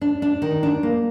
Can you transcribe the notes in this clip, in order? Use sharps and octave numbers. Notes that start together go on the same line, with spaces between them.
D4
D4
D#3
D4
A#3